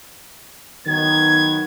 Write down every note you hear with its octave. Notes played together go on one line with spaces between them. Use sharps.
D#3 F#3 B3 G#6